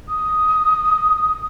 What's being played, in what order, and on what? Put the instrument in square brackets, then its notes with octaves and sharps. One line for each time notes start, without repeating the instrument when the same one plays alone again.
[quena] D#6